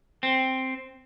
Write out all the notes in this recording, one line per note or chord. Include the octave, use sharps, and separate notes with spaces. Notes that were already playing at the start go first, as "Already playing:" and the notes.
C4